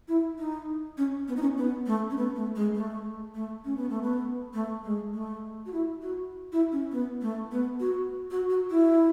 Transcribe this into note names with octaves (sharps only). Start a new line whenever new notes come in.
E4
D#4
C#4
B3
D#4
C#4
B3
A3
C#4
B3
A3
G#3
A3
A3
C#4
B3
A3
B3
A3
G#3
A3
F#4
E4
F#4
E4
C#4
B3
A3
B3
F#4
F#4
F#4
E4